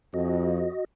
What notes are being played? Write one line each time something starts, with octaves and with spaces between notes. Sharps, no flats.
F2 F#4 D#5